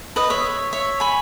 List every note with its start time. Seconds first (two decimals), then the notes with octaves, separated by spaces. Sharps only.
0.16 B4 D#5
0.30 C#5 E5
0.73 C#5 E5
1.00 G#5 B5